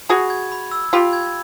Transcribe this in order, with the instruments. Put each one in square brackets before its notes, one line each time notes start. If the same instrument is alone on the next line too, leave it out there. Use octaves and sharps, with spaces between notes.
[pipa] F#4 G#4 [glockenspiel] B5
[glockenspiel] G#6
B5
E6
[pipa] F4 G4 [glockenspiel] B5
[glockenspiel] G#6